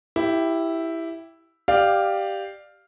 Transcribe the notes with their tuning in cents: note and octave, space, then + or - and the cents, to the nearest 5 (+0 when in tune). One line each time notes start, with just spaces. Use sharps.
E4 +0 G4 +0 F5 -45
G4 +0 D5 +20 F5 +0